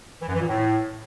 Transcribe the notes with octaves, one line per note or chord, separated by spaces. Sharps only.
E3
F#2
E3
A#2
A2